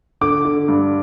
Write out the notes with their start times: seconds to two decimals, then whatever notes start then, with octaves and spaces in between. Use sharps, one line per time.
0.21 D3 D6
0.45 D3
0.68 G2